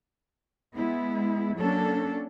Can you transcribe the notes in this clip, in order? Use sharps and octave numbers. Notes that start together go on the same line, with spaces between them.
G#3 B3 E4
F#3 A#3 C#4 D4 A4